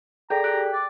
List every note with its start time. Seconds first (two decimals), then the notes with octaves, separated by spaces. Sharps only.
0.30 G#4 A4 D5 G5 A#5
0.44 G4 F#6
0.73 D5